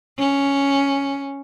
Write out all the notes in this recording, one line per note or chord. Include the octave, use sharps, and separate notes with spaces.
C#4